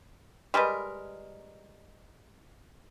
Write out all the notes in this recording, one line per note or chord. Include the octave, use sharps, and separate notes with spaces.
G3 G#3 A#4 B4